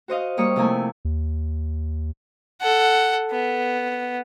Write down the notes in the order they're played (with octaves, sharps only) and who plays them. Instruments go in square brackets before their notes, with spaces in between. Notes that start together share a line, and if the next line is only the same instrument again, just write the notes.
[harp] F#4 C5 D#5 F5
G3 A#3 C#5 C#6 D#6
C3 F3 A3 A#3 E4 G#5
[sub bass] D#2
[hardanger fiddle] A4 F#5
B3